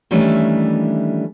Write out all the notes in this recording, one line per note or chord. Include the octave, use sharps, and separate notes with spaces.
D#3 E3 G3 A3 C#4 D4